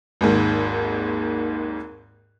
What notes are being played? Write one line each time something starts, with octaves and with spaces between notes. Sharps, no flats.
G#1 D#2 G#2